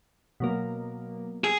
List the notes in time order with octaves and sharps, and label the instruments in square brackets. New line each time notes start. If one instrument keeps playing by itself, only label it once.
[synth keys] B2 F#3 A#3
[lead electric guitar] G#4 [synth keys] E6